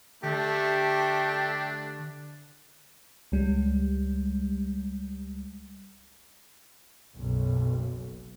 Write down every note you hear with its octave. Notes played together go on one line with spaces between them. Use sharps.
D3 A3 D4 G4
C#2 G3 G#3
F#1 B1